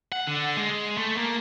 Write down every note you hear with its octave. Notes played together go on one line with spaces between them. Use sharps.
F#5
D3
G#3
A3
A#3